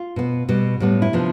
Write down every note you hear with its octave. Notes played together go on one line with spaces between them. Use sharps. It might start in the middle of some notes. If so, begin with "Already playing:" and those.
Already playing: F4
B2 B3
B2 G3 B3
A2 G3 B3
E4
C3 F3 B3 D4